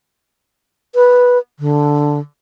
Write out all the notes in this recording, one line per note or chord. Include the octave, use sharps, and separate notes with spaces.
B4
D3